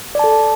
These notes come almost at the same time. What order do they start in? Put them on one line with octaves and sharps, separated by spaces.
D5 A5 A4